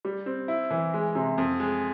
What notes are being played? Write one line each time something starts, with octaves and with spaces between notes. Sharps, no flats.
G3
C4
E4
E3
G#3
C3
F2
G#3